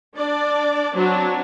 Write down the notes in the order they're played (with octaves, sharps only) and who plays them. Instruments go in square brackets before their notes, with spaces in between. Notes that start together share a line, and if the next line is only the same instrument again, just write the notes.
[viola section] D4 D5
F#3 C4 D4